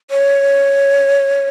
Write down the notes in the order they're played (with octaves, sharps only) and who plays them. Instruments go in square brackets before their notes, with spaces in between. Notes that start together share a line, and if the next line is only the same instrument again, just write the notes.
[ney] C#5